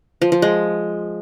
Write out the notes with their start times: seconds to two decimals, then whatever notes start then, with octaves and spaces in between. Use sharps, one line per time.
0.22 F3
0.32 F3
0.42 G#3